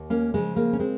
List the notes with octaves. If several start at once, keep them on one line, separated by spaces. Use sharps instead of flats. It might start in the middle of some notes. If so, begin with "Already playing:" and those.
Already playing: D#2
A#3 C#4
C#3 F3 G#3
A#3
C#4
G#3 C4